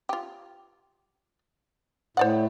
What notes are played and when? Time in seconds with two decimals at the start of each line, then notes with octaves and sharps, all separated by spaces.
0.09 F4 G4
2.17 A2 C5 D5 F#5